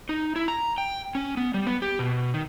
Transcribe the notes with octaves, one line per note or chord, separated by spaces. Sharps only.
D#4
E4
A#5
G5
C#4
B3
G3
B3
G4
B2
D#3